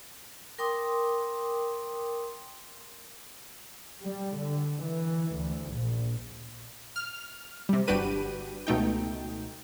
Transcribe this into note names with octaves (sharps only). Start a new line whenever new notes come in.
A#4 G5 C6 D6 D#6
G3
D3
E3
D2
A#1
F6
C3 G3
G1 D4 F#4 G4 B4 D#7
C#2 B2 A3 D#4 G5